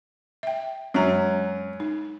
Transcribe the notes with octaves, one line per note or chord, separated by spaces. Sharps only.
E5 G5
F#2 G#3 A#5
D#4